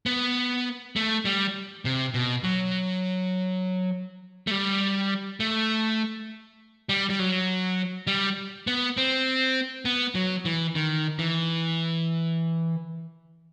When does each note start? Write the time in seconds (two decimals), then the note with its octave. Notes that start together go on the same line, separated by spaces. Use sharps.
0.06 B3
0.96 A3
1.25 G3
1.85 C3
2.14 B2
2.44 F#3
4.47 A3
4.51 G3
5.40 A3
6.89 G3
7.10 G3
7.19 F#3
8.07 G3
8.67 B3
8.97 C4
9.85 B3
10.15 F#3
10.45 E3
10.75 D#3
11.19 E3